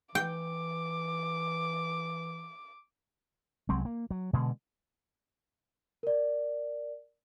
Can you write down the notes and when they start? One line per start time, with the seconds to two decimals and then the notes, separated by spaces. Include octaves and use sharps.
0.15 E3 G5 D6
3.69 C2 F#3 G#3 C4
3.85 A#3
4.11 F#3
4.33 B2 D3 G#3
6.03 A#4 D5